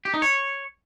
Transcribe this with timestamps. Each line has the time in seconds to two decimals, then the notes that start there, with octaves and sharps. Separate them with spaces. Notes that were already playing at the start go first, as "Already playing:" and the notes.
0.05 G4
0.14 D#4
0.22 C#5